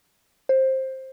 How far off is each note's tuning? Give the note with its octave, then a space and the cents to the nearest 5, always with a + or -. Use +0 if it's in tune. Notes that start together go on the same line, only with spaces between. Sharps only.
C5 +15